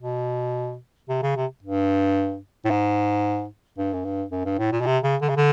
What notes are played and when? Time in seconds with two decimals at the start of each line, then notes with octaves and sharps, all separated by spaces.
0.02 B2
1.09 C3
1.23 C#3
1.36 C3
1.63 G2
2.65 A2
2.71 G#2
3.78 G2
3.94 F#2
4.05 G2
4.32 F#2
4.46 G2
4.59 A2
4.72 A#2
4.81 B2
4.86 C3
5.04 C#3
5.22 D3
5.29 C#3
5.36 D3